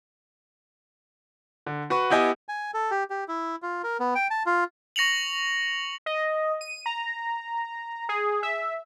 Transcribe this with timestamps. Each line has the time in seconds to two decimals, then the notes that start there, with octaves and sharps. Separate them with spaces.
1.66 D3
1.90 F#4 B4 C#6
2.10 B3 E4 G4 D#5 G#5
2.49 G#5
2.74 A4
2.91 G4
3.10 G4
3.28 E4
3.62 F4
3.84 A#4
4.00 B3
4.15 G5
4.30 A5
4.46 F4
4.96 C#6 A#6 C#7 F7 F#7
6.06 D#5
6.61 D#7
6.86 A#5
8.09 G#4
8.43 E5